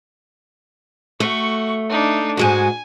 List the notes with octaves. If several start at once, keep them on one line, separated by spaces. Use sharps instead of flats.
A3 F#4 C#6
D4 D#4
G#2 G#3 F#4 G#5